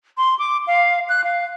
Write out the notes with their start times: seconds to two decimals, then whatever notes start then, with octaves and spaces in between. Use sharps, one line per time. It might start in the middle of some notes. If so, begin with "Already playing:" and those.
0.18 C6
0.39 D6
0.67 F5
1.09 F#6
1.24 F5